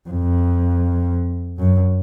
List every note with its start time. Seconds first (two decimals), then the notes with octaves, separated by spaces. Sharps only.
0.09 F2
1.58 F#2